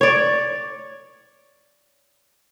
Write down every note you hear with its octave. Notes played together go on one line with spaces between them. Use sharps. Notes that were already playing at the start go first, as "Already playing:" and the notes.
C#5 D5